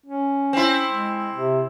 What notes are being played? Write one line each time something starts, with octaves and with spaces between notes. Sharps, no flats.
C#4
C4 E4
G#3
C3